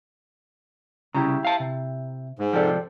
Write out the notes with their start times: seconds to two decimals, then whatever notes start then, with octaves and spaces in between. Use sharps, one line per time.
1.15 C2 C#3 E4 G4 A#5
1.45 F5 A5
1.60 C3
2.39 G#2
2.53 C3 F3 G4 A4 D5